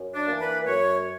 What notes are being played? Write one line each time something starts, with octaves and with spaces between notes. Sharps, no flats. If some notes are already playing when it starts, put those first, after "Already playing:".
Already playing: F#2
D4
E3 A#3
B4
F#2 C#5